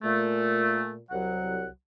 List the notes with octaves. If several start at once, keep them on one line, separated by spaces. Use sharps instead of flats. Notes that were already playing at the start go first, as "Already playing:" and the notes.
A#2 A3
C2 F#3 F#5